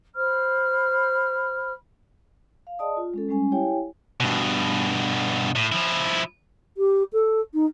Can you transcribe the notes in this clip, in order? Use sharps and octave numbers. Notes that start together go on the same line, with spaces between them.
C5 B5 F6
F5
G#4 D5 D#5 A5 D#6
F4
G#3 C#4 A4
G3 G#3 C#4 G#5
E4 G4 C#5 F5 G5 G#5
G2 B2
A2
F3 E4
G4
A4
D#4